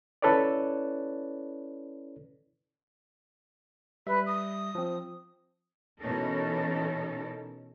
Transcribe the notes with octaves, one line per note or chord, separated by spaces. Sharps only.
C#4 E4 A4 B4 C#5 D5
G3 B4 E5
D#6
F3 C4
B2 E3 C#4 D#4 A4 A#4